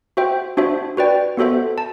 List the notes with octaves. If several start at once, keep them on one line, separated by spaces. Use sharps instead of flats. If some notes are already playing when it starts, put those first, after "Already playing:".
F#4 C5 E5 G5
D4 F#4 C5 E5
F#4 B4 D5 G5
B3 F#4 A4 C5 E5
A5